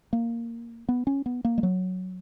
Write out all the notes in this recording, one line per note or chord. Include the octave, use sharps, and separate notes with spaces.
A#3
B3
C#4
B3
A#3
G#3
F#3